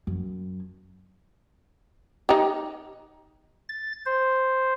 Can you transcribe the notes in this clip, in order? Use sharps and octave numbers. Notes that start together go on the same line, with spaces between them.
F#2
D#4 G4
A6
C5